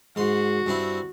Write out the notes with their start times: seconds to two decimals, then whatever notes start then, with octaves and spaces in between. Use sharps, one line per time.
0.16 G#2 F#4 C6
0.66 G2 C4 E4